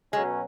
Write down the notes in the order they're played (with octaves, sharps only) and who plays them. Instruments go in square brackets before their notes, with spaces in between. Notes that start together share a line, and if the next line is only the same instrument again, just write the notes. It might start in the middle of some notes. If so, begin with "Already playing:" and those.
[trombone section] B2 F#3 C#4 [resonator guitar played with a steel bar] G#3